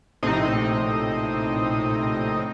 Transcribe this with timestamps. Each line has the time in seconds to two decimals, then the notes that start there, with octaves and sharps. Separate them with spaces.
0.23 A#1 A2 C3 C4 D#4 D#5